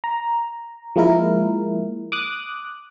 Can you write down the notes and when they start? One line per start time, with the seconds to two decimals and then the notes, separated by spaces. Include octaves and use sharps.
0.04 A#5
0.96 F3 G#3 A#3 E4 A#4
2.12 D6 D#6 F#6